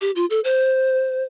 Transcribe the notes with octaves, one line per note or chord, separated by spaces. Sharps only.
G4
F4
A4
C5